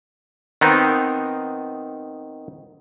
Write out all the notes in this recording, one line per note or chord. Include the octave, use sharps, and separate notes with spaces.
D#3 B3 C4 D#4